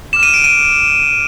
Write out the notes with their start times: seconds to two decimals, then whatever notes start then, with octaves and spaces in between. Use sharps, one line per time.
0.13 D6 F6 E7
0.23 D#7
0.34 D7
0.44 D#7